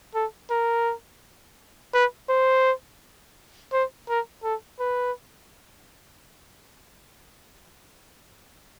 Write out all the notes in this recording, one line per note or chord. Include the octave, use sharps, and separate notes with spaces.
A4
A#4
B4
C5
C5
A#4
A4
B4